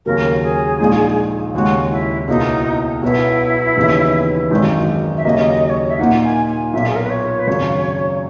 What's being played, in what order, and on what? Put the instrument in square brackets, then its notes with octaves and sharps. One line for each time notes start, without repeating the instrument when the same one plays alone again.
[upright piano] D#2 C#3 F#3 [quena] A#4
[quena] G#4
[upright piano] A#1 A#2 G#3 D#4
[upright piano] D#2 C#3 G#3 [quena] F#4
[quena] E4
[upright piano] C#2 B2 A#3 E4 [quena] D#4
[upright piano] B1 B2 F#3 B3 [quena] E4
[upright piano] D#2 C#3 E3 B3 D#4
G#1 F#2 D#3 G#3 D#4
[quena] E5
[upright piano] D#2 C#3 F#3 A#3 [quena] D#5
[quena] C#5
D#5
E5
[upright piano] A#2 A#3 D#4 [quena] F#5
[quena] G#5
G#5
[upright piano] B1 A#2 A#3 [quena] E5
[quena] G#4
A#4
B4
C#5
B4
[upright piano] G#1 F#2 C#3 [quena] C#5